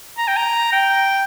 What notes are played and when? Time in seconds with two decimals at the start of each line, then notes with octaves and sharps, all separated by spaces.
0.18 A#5
0.28 G5
0.37 A#5
0.72 G5